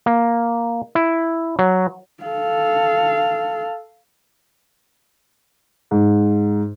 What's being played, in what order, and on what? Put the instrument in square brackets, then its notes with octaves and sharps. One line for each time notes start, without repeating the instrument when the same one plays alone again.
[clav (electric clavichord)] A#3
E4
F#3
[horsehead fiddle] A4 F5
[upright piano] G#2